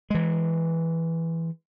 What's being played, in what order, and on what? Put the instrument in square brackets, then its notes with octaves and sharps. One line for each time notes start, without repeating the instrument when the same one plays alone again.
[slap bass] E3 G#3